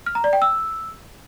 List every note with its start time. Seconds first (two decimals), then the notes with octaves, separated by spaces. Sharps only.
0.06 F6
0.15 A#5
0.24 D5
0.33 G5
0.42 E6